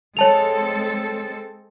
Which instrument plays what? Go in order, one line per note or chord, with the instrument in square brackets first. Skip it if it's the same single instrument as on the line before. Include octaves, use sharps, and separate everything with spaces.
[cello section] G#3 C4 A4 [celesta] C#5 A5 F7